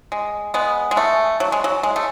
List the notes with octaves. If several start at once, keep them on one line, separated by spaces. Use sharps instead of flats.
G#3
G#3 B3
G#3
A3
F#3
G#3
F#3
G#3
A3